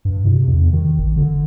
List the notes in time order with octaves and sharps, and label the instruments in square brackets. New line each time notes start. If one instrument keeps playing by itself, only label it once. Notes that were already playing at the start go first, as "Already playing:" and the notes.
[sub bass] G2
C3
E2
D#3
G#1
D3